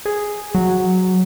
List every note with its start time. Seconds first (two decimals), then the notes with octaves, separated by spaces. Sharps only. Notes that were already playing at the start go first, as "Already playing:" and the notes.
0.06 G#4
0.55 F#3